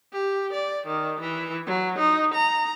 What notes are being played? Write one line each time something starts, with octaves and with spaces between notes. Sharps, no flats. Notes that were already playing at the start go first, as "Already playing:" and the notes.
G4
D5
D#3
E3
F#3
D#4
A#5